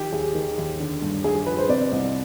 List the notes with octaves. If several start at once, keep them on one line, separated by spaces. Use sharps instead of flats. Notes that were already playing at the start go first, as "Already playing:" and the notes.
Already playing: D#3 F3 G4
D#2 G#4
D#3
D#2
D3
G2
G2 G#4
G#4
F3 B4
C5
C3 D5
C2 D#5